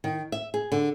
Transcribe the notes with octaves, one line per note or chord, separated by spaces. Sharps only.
D#3
E5
G#4
D3